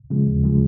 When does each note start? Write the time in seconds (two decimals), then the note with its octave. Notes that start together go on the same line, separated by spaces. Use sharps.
0.10 C#3 F3 G#3
0.27 D#2
0.44 C#3 F3 G#3